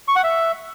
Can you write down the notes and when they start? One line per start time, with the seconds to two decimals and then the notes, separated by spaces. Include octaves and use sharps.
0.08 C#6
0.16 F#5
0.23 E5